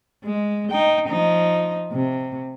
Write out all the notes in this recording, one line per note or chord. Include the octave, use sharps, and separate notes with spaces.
G#3
D#4 G5
F3 D#4
C3